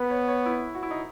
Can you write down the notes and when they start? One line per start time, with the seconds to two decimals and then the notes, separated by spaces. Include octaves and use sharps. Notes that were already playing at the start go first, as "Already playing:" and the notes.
Already playing: B3 B4
0.10 C#5
0.28 C#5
0.46 E4
0.75 F#4
0.83 E4
0.91 D#4